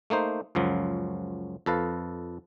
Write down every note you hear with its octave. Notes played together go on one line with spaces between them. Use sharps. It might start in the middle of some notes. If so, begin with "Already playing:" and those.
A3 A#3 D#4 C5
C#2 F#2 F3 F#3
F2 A4 B4 F5